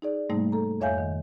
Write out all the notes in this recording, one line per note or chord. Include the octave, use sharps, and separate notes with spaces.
D#4 G#4 D5
G#2 C3 G3 A3 A#3 D#4
A4 A#5
F2 C#5 E5 F5 G#5 G6
D#3